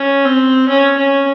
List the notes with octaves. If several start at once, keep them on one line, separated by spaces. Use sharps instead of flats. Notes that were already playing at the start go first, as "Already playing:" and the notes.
Already playing: C#4
C4
C#4
C#4